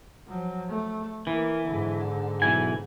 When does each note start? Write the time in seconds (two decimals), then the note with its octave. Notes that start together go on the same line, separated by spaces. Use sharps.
0.28 F3 F#3
0.69 A3
1.27 E3 A#3
1.67 G#2 D3
2.42 B1 E3 G#5